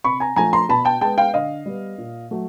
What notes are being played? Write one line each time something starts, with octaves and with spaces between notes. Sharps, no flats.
C3 B5 C#6
G#5 A#5
F3 A3 G#5 A#5
A#5 C6
B2 A5 B5
G5 A5
G#3 B3 G5 A5
F5 G5
D3 D#5 F5
G3 B3
A#2
F#3 A3